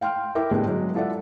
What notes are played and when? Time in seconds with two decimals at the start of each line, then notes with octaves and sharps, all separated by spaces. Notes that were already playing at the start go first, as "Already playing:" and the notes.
0.01 F5 G5 C6 F6
0.35 E4 A#4 E5 G5 D6
0.51 A2 D3 G3 G#3 B3
0.67 F#3 G#3
0.94 E4 F4 A4 D5 E5 F#5